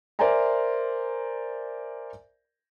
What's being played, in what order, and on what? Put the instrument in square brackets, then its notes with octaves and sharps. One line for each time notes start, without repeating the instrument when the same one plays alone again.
[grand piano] A#4 C5 D5 E5 G#5 A#5